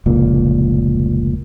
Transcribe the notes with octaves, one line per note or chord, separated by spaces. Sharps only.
F1 C#2 A#2